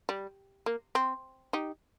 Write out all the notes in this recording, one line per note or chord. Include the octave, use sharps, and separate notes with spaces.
G3
A#3
C4
D#4 G4